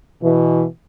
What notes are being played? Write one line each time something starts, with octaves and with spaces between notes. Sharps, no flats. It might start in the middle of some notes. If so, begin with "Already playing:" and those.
B2 E3